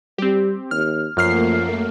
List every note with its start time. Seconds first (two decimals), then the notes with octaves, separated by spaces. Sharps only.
0.18 G3 C4 G4
0.71 D#2 F6
1.17 F#2 F3 A3 A#3 F6 C7